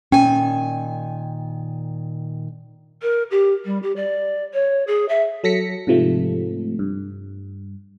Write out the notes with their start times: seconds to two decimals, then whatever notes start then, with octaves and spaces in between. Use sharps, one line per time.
0.12 A#2 D#3 C#4 G5 G#5
3.02 A#4
3.31 G4
3.65 G3
3.83 G4
3.96 D5
4.54 C#5
4.87 G#4
5.09 E5
5.44 F#3 A4 A#6 B6 C#7
5.87 G#2 C3 F3 A3
6.79 G2